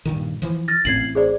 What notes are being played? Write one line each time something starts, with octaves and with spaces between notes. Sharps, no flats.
G2 A#2 D#3
E3 F3
F6 A6 A#6
A1 A2 C4 G#6 C7 F#7
G#4 C5 D5